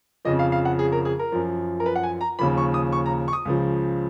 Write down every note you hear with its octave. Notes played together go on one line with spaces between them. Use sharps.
F2 C#3 F3 D#5
F5
F5
F#5
G#4
A#4
G#4
A#4
F#2 F3
A#4
B4
F#5
G#5
A#5
D#2 C#3 F3 B5
C#6
D#6
C#6
A#5
C#6
D#6
C#2 C#3 F3